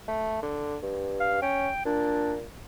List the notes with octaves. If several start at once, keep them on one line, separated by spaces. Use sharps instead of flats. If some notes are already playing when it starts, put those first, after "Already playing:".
A3
D3
G2
F5
C#4 G5
A#2 D4